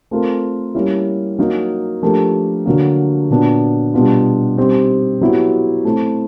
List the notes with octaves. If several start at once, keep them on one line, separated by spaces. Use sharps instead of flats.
A3 C4 F4 A#4
G3 A#3 C#4 E4
F#3 A#3 D#4
F3 A3 D4 G4 A#4
D3 F#3 A#3
A#2 F#3 B3 D4
B2 G3 B3 D4 F4
G3 C4 D#4 G4
F#3 B3 E4 G4
A3 C4 E4